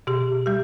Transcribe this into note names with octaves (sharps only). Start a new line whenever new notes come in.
B2 G4
G3 G4